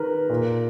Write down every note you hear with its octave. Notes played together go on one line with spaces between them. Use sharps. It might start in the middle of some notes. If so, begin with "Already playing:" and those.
Already playing: D#3 A#4 B4
A#2